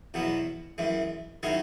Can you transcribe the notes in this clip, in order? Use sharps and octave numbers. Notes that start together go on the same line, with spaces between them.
E2 B2 F#3 B3
F#2 E3 G#3
D#3 F#3 C#4 E4 G#4